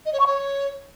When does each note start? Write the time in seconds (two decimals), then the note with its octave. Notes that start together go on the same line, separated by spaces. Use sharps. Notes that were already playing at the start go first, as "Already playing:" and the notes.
0.05 D#5
0.12 C#5
0.19 C#6
0.26 C#5